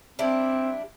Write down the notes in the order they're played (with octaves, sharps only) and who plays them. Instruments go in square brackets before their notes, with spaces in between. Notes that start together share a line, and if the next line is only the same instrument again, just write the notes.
[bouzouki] G3 D4 E4 [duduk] C4